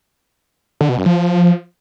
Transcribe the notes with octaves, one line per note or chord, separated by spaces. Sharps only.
D3
B2
F#2
F3